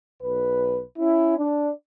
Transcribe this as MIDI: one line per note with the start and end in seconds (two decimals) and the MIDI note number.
0.22 0.81 35
0.22 0.81 71
0.98 1.38 61
0.98 1.38 64
1.38 1.71 62